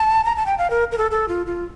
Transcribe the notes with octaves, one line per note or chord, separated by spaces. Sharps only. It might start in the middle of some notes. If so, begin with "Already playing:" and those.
Already playing: A5
A#5
A5
G5
F5
A#4
A#4
A4
A4
F4
F4